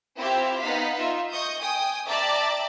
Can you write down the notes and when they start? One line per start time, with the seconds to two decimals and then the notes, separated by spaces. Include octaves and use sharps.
0.17 C4 E4 F4 G4 E5
0.60 B3 D#4 F5 F#5 B6
0.95 D#4 F4 E5
1.32 D#5 C#6 D#6 G6
1.62 G5 G#5 D#6
2.07 D5 E5 G5 A5 A#5 D6